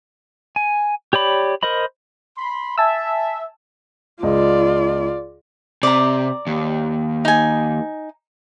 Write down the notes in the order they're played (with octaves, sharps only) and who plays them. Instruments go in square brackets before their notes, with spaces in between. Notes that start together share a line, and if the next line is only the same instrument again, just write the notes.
[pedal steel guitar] G#5
G4 C#5 D5 B5
A#4 C5 D#5 B5
[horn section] B5 C6
[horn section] E5 [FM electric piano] G#5 A5 E6
[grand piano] C#2 D#5 [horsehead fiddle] F4 D5
[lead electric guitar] C3 [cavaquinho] D5 A#5
[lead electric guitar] D#2
[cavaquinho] D#4 G#5